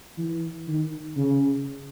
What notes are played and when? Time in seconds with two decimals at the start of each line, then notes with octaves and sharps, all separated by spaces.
0.18 E3
0.67 D#3
1.17 C#3